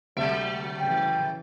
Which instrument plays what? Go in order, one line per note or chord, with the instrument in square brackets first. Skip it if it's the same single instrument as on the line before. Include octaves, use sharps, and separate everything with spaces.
[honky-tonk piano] D2 C3 D7 [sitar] F#3 A3 E5
[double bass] C#3 E3 [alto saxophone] G5